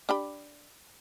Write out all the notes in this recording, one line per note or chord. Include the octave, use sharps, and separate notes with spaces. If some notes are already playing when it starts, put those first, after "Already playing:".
D4 G4 B5